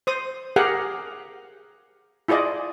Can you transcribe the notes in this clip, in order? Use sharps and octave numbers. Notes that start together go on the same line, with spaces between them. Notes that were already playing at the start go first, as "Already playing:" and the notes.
C5 D#6
G4 G#4 A#4 F5 F#5
E4 F4 G#4 D5 D#5